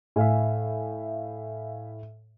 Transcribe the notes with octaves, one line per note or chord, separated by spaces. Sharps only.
A2 E5 F5 G#5